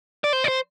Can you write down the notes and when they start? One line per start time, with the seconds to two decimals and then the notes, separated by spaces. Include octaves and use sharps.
0.24 D5
0.33 C5
0.44 D5
0.48 C5